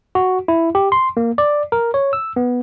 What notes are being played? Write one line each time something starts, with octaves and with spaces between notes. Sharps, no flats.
F#4
E4
G4
C6
A#3
D5
A#4
C#5
E6
B3